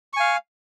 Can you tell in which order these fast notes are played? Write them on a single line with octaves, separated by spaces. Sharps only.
C#6 G#5 F5